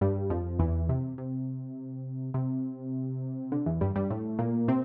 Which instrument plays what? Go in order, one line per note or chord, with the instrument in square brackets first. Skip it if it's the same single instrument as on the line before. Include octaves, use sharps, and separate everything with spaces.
[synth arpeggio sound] G2 G3
F2 F3
E2 E3
C3
C3
C3
D3
E2 E3
G2 G3
G2 G3
A2 A3
A#2 A#3
C3 C4